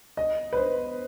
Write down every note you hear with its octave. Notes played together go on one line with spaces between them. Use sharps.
D#5
B4
C5